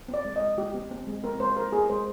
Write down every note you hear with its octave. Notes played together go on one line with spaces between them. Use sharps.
C4
D5
G#3
D#5
G#3
G#3 G4
C4
C4
G#3
C4 A#4
G#3 C5
G#3 A#4
C4 G#4
G#3 C5